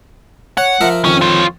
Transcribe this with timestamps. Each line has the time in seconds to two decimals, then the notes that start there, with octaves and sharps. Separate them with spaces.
0.57 C#5 F#5
0.81 F3 A#4 E5
1.05 F2 D#3 C#4
1.21 F4 C#5